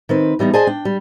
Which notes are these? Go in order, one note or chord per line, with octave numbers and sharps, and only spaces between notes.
D#3 C4 B4
E3 G3 B3 D#4
G#4 C5 D5 D#5 G#5 A5
D4 G5
G3